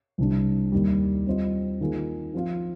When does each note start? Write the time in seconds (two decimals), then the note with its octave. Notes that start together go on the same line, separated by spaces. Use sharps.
0.18 C2 C3 G3 D4
0.72 D#2 D#3 G3
1.27 G3 C4 F4 C5 D#5
1.81 D#3 A#3 F4 G#4
2.34 F3 C4 F4